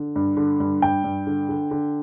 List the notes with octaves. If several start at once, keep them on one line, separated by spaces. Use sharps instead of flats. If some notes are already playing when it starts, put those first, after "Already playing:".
Already playing: D3
G2
D3
G2
G2 G5
G2
D3
D3
D3